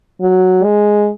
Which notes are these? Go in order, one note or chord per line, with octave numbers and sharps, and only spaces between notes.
F#3
G#3